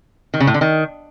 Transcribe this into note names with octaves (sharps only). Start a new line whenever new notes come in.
D#3
C#3
A2
D3
D#3